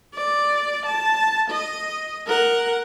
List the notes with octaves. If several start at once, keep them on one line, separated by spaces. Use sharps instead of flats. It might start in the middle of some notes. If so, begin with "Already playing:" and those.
D5
A5
D#5
A#4 F#5